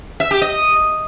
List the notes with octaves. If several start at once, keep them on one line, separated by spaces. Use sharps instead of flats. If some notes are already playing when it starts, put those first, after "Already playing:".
E5
G4
D#5